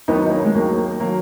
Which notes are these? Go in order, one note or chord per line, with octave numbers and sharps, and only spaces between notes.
D#2 D#3 F#3 B3 D#4
D#4
A#3 C#4
G#3
D#2 D#3 F#3 A#3
A#3
D#3 F#3 A#3